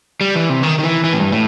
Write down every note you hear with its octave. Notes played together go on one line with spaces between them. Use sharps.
G3
E3
C3
D#3
D#3
E3
E3
A2
G2
A2